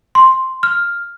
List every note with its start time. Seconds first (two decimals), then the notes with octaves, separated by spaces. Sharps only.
0.15 C6
0.63 F6